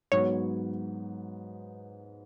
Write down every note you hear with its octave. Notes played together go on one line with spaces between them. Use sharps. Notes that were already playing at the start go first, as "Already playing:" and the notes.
G#2 F#3 B3 F#4 C#5